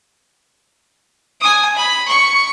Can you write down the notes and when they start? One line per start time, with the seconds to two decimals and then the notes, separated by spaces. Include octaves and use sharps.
1.41 G#5 D#6
1.76 B5
2.08 C#6